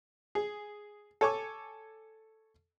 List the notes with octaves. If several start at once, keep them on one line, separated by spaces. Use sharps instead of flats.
G#4
A4 C#5 G#5 C#6 D6